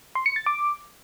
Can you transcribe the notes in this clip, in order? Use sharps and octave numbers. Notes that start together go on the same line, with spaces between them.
C6
C#7
A6
D6